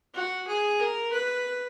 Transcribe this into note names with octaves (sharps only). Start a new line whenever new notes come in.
F#4
G#4
A#4
B4